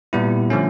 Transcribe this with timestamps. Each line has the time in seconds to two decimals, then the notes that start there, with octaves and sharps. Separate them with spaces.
0.13 A#2 G3 B3 E4
0.50 D3 F3 A3 C#4